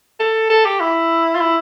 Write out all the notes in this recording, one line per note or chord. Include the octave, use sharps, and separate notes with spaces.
A4
A4
G4
E4
F4
E4